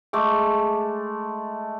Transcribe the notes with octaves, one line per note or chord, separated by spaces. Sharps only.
G#3 A3 G#4 D6